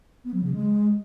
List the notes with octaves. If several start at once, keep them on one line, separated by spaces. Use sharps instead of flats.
B3
F#3
C#3
G#3